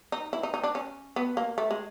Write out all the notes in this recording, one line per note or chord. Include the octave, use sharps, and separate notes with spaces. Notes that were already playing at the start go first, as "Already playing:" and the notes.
D#4
E4
D#4
D#4
D4
C#4
B3
A#3
A3
G#3